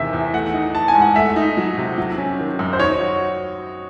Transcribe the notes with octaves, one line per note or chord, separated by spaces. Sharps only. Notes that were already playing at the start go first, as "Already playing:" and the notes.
Already playing: E2 C3 D#3 E5
E2
A3 F#5
D#4
E3 A5
G#5
G#2
F#5
A3 E5
D#4
F#3
C3
F#3
C#4
D#3
F#2
C5
D#4 C#5
F#4